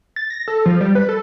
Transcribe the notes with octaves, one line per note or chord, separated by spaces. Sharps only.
A6
A#6
A4
F3
G3
B4
A4